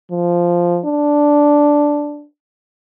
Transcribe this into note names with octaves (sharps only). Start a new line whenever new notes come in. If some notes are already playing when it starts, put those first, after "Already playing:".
F3
D4